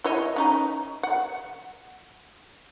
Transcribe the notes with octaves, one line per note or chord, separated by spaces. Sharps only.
E4 C#5 D#5
C#4 D#4 A#5
F#5